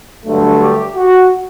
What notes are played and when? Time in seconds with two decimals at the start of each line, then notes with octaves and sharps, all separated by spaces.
0.25 G2 D3 F#3 A3
0.60 G4
0.95 F#4